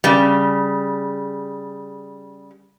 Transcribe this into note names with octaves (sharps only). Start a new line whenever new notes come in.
C#3 G3